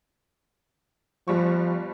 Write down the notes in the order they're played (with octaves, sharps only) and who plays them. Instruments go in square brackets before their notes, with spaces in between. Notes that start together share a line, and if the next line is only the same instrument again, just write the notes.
[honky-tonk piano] G1 G3 C#6 [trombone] F3